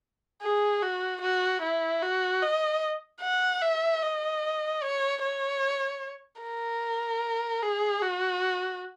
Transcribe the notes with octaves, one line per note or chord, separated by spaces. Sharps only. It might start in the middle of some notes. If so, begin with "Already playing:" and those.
G#4
F#4
F#4
E4
F#4
D#5
F#5
E5
D#5
C#5
C#5
A#4
G#4
F#4